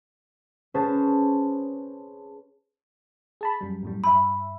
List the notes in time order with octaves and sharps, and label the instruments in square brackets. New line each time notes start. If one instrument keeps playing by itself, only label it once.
[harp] C#4 G#4 B4 C5 A5
[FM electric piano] G#4 A5 B5
F#2 G3
F#2 A2 G3
[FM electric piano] G2 E5 [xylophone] B5